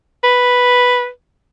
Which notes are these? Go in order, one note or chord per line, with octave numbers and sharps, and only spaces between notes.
B4